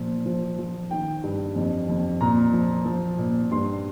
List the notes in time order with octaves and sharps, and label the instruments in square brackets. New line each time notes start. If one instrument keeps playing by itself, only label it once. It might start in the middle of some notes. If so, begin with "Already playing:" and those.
Already playing: [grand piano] A#2 F3
F3
F3
D#3 G5
G2
F2
F2
A#2 A#5
F3
F3
A#2
G2 C6